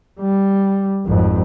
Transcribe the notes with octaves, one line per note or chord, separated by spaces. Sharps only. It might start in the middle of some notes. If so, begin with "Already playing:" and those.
G3
G#1 F2